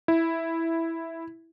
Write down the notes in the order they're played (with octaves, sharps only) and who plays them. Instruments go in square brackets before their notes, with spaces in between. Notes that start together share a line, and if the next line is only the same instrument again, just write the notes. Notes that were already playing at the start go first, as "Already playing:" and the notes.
[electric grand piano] E4